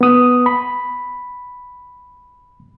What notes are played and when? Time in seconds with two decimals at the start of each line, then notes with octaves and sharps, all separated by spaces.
0.01 B3 D#6
0.46 B5